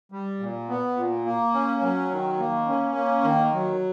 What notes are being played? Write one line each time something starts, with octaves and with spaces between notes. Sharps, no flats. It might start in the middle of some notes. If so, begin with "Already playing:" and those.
G3
A#2
B3
A#2
A#3
C#4
F#3
D#3
A#3
C#4
A#3
D#3
F#3